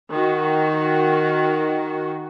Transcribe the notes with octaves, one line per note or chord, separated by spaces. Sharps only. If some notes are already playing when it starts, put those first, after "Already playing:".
D#3 F#4